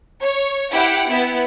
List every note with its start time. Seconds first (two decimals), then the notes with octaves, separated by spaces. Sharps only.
0.20 C#5
0.72 E4 G4 F#5 G5 D7
1.09 B3 E4